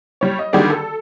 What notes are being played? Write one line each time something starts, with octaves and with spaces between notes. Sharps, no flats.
G3 C#5
D#5
D3 D#3 G3 F#4 G#4 D5
A4